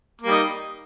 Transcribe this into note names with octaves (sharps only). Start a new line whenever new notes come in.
G3 A#3 D#4